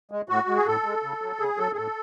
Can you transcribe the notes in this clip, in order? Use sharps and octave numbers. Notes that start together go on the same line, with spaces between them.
G#3
A2 F#4
G#3
G#4
A2 A4
G#3
C#3
F#3
C#3 G#4
F#3 A4
G#4
A2 A4